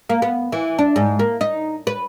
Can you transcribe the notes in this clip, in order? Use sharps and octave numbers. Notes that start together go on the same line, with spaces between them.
A#3
B3
E3
D4
G#2
A#3
D#4
B4